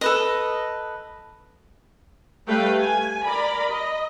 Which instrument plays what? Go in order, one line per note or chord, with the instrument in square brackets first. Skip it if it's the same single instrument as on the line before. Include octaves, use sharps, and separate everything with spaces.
[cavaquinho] A4 B4 D#5
[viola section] G3 A3 B4 F5 G5
G#5
A#4 D5 B5
D#5